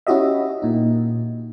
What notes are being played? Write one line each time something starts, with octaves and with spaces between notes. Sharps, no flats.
C#4 E4 F#4 G4 D#5 E5
A#2 D#4